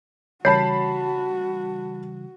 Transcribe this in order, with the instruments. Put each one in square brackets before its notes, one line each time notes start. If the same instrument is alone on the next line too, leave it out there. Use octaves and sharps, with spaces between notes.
[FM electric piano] C#3 E3 G3 [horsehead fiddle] F#4 [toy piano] C#5 [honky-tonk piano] A5 B5 C7